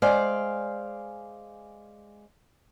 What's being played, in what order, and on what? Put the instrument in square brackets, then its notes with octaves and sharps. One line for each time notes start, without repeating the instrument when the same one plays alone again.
[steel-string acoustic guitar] G#3 C5 D5 F5